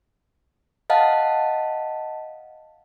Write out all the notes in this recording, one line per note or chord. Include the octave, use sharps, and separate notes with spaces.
D#5 F5 F#5 A5